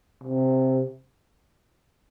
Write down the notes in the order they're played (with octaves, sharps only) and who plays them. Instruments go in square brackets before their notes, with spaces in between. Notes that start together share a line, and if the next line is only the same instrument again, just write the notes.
[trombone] C3